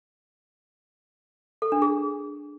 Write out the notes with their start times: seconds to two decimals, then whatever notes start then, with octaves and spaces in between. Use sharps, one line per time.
1.62 A4
1.72 D4
1.82 G#4